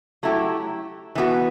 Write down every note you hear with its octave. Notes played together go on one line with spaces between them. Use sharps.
F#3 A3 E4 G4
E3 B3 F#4